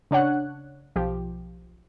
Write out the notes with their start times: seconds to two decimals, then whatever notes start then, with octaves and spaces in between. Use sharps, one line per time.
0.11 C#3 D4 C#5 F#5 F#6
0.96 B1 F3 G4